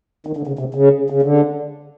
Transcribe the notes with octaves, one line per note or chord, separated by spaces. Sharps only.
D#3
D3
C#3
C3
C#3
C#3
D3